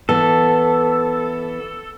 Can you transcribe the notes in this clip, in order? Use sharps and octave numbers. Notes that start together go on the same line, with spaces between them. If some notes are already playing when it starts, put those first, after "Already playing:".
E3 B3 A4